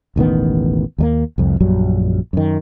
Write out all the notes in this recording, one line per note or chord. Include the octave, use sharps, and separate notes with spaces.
E1 A1 D#3 B3
D#2 G3 A#3
C2 F2
A#1 F#2 F#3 G3
F#2 D#3